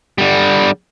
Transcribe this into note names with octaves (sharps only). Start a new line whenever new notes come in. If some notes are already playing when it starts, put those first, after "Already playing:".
D3 G3